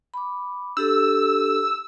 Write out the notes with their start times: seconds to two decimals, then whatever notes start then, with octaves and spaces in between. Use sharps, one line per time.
0.14 B5 D6
0.77 D4 G4 A4 E6